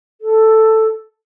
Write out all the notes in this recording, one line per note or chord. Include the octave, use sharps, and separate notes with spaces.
A4